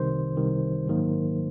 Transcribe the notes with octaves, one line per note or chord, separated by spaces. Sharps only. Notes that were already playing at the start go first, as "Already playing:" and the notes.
Already playing: C2 C3 D#3 C5
C2 C3 D#3
A#1 G#2 D#3 F#3 A#3